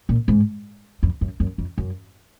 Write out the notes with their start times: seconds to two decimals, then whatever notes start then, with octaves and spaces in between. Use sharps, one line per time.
0.09 A#2
0.28 G#2
1.03 F2
1.21 F#2
1.40 F#2
1.58 F2
1.78 F#2